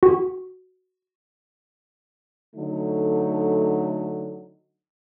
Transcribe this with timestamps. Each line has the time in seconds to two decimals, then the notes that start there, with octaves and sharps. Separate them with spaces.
0.03 F#4
2.56 D3 F#3 A3 D#4